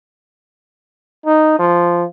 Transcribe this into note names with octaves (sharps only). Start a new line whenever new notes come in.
D#4
F3